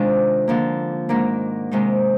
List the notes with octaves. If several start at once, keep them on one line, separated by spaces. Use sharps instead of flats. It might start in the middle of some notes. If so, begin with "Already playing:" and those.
Already playing: C3 D#3 G#3 D4 F4
D3 F3 A#3
G#2 D#3 A#3 D4
C3 D#3 G#3 D#4